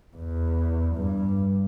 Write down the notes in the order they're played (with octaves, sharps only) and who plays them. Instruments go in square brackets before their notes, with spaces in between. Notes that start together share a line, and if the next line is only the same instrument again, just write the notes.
[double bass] E2
G2